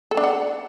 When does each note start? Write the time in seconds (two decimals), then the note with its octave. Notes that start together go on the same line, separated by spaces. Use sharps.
0.11 A4
0.17 D4
0.23 F#5